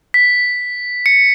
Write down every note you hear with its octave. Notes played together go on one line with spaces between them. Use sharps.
B6
C#7